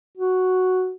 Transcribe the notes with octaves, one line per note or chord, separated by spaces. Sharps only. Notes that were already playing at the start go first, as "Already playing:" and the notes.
F#4